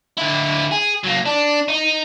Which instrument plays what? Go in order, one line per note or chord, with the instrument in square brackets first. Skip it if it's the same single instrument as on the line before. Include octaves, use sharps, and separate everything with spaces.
[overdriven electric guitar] D3 E4
G#4
F#3 A#3
D4
D#4